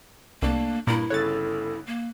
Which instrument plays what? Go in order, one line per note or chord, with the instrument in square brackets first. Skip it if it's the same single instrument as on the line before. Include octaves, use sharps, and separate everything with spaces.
[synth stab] C2 [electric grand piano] A3 D4 A5 [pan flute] A#3
[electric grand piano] G2 [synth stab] A#2 A#4 [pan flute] E4
[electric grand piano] G1 C#3 F#6 [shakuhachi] A4 [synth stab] C#5 A6
[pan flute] A#3